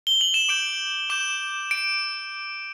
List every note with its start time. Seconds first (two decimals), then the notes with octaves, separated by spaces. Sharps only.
0.07 G7
0.21 F#7
0.34 E7
0.48 D6 G6 D7
1.10 D6 G6 E7
1.71 D7